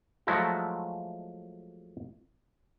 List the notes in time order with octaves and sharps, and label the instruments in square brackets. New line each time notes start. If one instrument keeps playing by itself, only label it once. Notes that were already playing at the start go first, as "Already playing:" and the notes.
[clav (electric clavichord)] F3 F#3 G#3 A3 E4 F#4